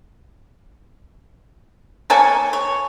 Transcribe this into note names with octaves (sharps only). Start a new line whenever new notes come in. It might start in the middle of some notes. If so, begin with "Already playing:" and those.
A#3 A4 C#5 G#5
C#5